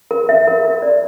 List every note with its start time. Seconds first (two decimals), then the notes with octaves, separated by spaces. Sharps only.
0.11 A#4
0.29 E5
0.47 A#4
0.65 A#4
0.82 D5